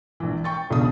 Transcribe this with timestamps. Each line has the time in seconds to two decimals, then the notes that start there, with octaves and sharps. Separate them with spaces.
0.20 A#1 E3
0.44 G5 C#6 A6
0.70 E1 C#2 G2 B2 D#6